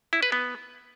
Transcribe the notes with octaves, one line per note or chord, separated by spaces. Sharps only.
E4
B4
B3